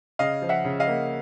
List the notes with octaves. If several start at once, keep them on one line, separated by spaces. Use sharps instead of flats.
C#3 D#5 F5
F3
E5 F#5
C#3
D#5 F5
A#3